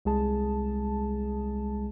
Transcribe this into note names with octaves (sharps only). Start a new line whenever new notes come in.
C2 G#3 G#4 A5